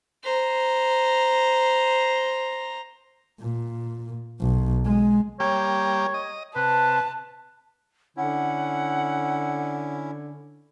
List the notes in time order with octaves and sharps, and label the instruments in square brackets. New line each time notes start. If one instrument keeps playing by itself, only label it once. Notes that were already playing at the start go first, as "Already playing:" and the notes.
[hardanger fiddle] C5 A#5
[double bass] A#2
B1
G#3
[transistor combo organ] G3 A#3 G4 [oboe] C#5
[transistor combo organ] D#5
[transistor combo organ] C3 [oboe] B4 [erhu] A5
[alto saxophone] D3 [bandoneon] C#4 E4 [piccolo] F#5